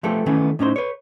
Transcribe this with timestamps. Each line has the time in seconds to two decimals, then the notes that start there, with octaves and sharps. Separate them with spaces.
0.03 F3 A3 B3 G4 A4
0.26 D#3 E3 A3 B3 C#4
0.59 A2 C#4 D#4 C5
0.76 B4 C#5